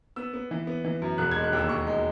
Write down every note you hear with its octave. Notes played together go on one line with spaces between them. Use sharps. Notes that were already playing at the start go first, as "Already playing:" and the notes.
B3 E6
B3
E3
B3
E3
F#2
E1 F#6
G#6
G#3
F#6
D#2 E6
D#2 C#6
G#3